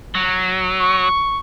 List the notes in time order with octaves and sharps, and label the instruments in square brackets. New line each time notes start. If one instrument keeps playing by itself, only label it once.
[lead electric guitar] F#3
[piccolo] C#6